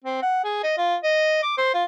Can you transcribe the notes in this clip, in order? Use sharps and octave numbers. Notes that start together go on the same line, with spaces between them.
C4
F#5
G#4
D#5
F4
D#5
D6
C5
F4